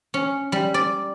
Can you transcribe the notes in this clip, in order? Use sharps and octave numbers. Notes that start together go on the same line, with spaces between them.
C#4
G3
D5